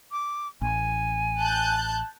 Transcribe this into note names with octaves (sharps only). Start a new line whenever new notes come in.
D6
A1 G#5
A5 F#6 G6